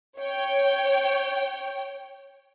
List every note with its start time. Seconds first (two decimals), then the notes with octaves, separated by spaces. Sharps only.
0.18 C#5 G5